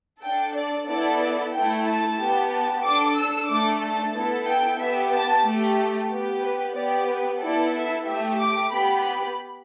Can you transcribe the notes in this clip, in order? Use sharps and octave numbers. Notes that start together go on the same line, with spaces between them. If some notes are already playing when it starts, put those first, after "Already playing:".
D4 A4 G5
D5
B3 E4 A4 D5
A3 E4 A4 G5
A5
B3 G4
A5
D4 A4 D6
E6
A3 D4 A4 D6
A5
B3 E4 A4
G5
B3 G4 E5
A5
A3 G4
B3 G4
B4
B3 G4 D5
B4
B3 E4 A4 D5
E5
A3 G4 E5
D6
B3 G4 B5
B5